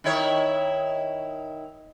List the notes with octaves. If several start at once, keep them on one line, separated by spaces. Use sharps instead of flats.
D#3 E4 C#5